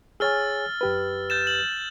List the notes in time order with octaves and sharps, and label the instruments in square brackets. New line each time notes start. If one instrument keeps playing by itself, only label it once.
[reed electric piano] G#4 C#5 G#5 [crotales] E6 F6 A6
[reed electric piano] F#2 G4 B4
[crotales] G6 A6 E7
F#7